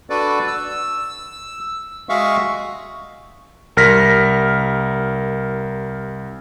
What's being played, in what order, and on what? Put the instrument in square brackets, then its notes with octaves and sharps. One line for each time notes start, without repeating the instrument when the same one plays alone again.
[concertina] D4 F#4 A4 B4 D5
E6
G#3 F#4 G#4 E5 F5 C#6
[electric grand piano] C2 A#4 F6 A#6 B6